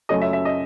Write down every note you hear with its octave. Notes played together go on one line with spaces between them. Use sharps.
F#2 C#3 F#3 A3 D#5
E5
E5
D#5